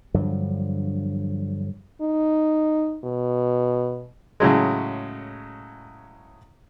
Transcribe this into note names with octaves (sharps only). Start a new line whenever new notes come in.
G2 D3 F3 F#3
D#4
B2
A2 C#3 F#3 G#3